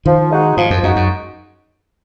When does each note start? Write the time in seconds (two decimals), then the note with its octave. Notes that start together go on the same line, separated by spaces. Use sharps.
0.05 D#3 F3
0.31 G#3 D#4 F#4
0.57 G#2 F3
0.70 F#2
0.83 F#2 G#3 D#4 F#4
0.96 F#2